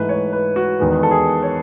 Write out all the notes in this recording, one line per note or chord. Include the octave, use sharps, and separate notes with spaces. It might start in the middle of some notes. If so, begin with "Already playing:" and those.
Already playing: G#2 E3 A3 B4
C#5
B4
F#4
E2 D#3 G#3 B3
A4
G#4
C#5